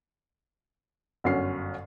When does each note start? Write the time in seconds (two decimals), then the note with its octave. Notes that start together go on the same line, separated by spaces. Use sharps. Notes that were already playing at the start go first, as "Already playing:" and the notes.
1.24 G1 F#2 D3 C#4 C7